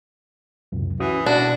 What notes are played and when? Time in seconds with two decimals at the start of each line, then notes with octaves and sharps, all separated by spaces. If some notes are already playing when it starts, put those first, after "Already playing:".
0.72 C#2 F#2 C3
1.00 E3 C#4 F#4 D#6
1.26 B2 D4 F#4